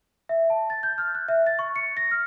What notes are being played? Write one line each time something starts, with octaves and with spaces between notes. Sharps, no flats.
E5
A5
A6
G6
F6
F#6
E5
A6
C#6
C#7
A#6
F6